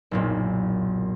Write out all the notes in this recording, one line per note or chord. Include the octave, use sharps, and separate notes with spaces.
F#1 B1 A#2